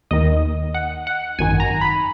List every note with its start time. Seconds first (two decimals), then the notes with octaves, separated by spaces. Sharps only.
0.11 D#2 D#3 D#5
0.74 F#5
1.07 F#5
1.39 G#1 F#2 D#3 G#5
1.60 A#5
1.81 B5